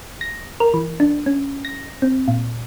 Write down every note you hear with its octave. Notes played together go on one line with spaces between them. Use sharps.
A#6
A#4
E3
D4
C#4
A#6
C4
A#2